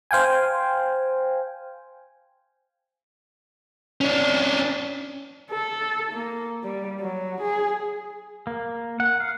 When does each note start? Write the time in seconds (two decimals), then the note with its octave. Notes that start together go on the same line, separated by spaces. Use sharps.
0.11 C5 F5 G5 G#5
4.01 C#4 D4
5.51 A4
6.12 A#3
6.63 G3
7.01 F#3
7.41 G#4
8.47 A#3
9.00 F#5
9.20 F5